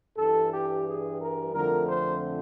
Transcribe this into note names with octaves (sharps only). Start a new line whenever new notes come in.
G2 E3 G3 A4
G4
G#4
A#4
F2 D3 F3 A3 C4 A#4
C5